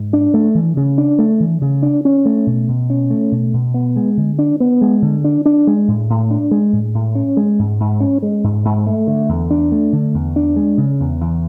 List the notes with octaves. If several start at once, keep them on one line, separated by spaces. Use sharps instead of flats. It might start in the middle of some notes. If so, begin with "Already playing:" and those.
Already playing: G#2
D4
A3
E3
C#3
D4
A3
E3
C#3
D4
C#4
A3
B2
B2
C#4
A3
B2
B2
B3
G#3
D3
D4
B3
G#3
D3
D4
D4
G#3
A2
A2
D4
G#3
A2
A2
C#4
G#3
G#2
G#2
C#4
G#3
G#2
G#2
A3
D3
E2
D4
A3
D3
E2
D4
G#3
C#3
E2
E2